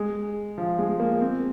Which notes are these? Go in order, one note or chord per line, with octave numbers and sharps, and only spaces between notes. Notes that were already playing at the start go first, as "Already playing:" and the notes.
Already playing: G#3
F3
G#3
A#3
C4